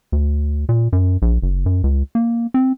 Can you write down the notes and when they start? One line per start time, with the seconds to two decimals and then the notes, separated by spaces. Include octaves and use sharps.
0.12 D2
0.69 A#2
0.92 F#2
1.22 A#1
1.42 F#1
1.66 F#2
1.84 C#2
2.15 A#3
2.54 C4